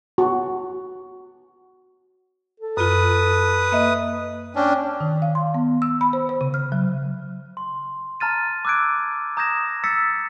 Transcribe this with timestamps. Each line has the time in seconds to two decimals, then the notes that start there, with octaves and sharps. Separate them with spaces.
0.18 F#4
2.60 A4
2.77 F#2 F4 B4 D#6
3.72 A#3 D#5 E5
4.56 C#4 D4 G5
5.00 D#3
5.22 F5
5.35 C6
5.54 B3
5.82 E6
6.01 B5
6.13 C5
6.29 C5
6.41 C#3
6.54 F6
6.72 F#3
7.57 C6
8.20 A5 A#5 F6 A6 D#7
8.65 D6 E6 F#6 G#6 D7
9.37 A#5 D#6 G6 G#6 A#6 E7
9.84 E6 A6 B6 C#7